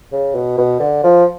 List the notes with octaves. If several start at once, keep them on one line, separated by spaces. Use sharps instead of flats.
C#3
B2
B2
D3
F3